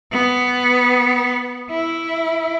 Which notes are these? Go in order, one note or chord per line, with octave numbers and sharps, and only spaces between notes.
B3
E4